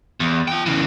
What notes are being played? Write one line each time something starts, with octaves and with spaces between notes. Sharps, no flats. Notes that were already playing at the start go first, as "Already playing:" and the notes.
E2
F4 G5
C#3 E3